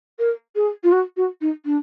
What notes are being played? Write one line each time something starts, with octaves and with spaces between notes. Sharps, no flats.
A#4
G#4
F4
F#4
F#4
D#4
D4